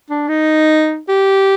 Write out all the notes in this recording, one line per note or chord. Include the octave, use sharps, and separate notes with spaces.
D4
D#4
G4